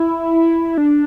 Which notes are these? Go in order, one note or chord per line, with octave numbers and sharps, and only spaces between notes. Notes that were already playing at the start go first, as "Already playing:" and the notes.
Already playing: E4
D4